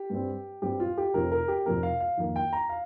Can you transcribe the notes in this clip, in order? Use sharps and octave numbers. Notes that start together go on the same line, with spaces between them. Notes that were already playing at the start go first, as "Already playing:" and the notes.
Already playing: G4
G2 G3 C4
G2 G3 C4 G4
F4
G4
F1 F2 F3 C4 A#4
A#4
G4
F1 F2 F3 C4 A#4
F5
F5
F2 D#3 A#3
G5
A#5
F5